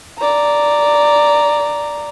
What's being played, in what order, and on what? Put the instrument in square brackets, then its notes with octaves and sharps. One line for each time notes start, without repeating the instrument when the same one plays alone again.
[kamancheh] D5 A#5